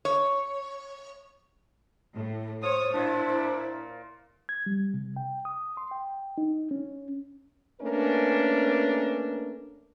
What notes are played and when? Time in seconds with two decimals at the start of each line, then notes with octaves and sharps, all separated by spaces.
0.05 C#5
2.14 A2
2.63 F4 C5 C#5 D#6
2.93 A#2 D4 E4 F4 C#5
3.29 A#3
4.49 G#6
4.66 G3
4.94 C3
5.16 G5
5.45 D#6
5.77 C6
5.91 G5
6.38 D#4
6.71 C#4
7.82 A3 A#3 C#4 D4 A#4 B4